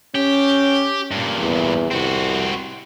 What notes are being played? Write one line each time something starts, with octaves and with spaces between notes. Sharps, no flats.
C#4 G4
G2 A#2
E2
C2 C4 F#4